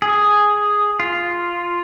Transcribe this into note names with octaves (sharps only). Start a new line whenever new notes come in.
G#4
F4